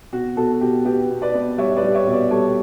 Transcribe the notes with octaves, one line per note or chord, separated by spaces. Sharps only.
B2 F#4
B2 F#4 A4
B2 G4
B3 G4
B2
B4 D5
B3
G3 C#5 E5
B4 D5
G3
C#5 E5
B2
B4 D5
G3 A4 C#5